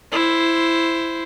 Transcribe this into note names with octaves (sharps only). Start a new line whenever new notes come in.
E4 C5